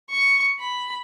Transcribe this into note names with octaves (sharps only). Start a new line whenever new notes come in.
C#6
B5